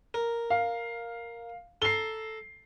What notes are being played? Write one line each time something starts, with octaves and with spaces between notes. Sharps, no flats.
A#4
F5
A4 A#5 C7 G7